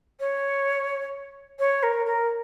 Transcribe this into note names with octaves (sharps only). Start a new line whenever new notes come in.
C#5
C#5
A#4
A#4